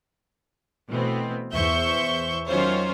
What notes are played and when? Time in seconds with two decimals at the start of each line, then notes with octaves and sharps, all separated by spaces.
0.88 B2 E3 A3 B3 C4
1.53 E2 C5 E5 C#6 G6
2.47 D#3 F#3 C#4 F4 C5 C#5